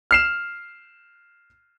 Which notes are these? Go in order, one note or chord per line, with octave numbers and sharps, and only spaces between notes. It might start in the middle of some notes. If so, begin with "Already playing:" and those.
F6 C7 E7